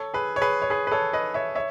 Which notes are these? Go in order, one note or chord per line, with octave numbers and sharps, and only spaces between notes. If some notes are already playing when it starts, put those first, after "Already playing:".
Already playing: A4 C#5
G#4 B4
C#5
G#4 B4
C#5
G#4 B4
B4
A4 C#5
B4 D#5
C#5 E5
C#5 E5